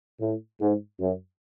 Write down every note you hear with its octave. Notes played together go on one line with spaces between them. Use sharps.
A2
G#2
F#2